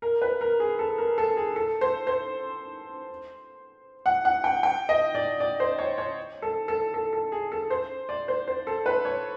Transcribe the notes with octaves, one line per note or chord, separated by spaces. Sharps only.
A#4
B4
A#4
G#4
A4
A#4
A4
G#4
A4
C5
C5
F#5
F#5
G5
G5
D#5
D5
D5
C5
C#5
C#5
A4
A4
A4
A4
G#4
A4
C5
D5
C5
C5
A4
B4
C#5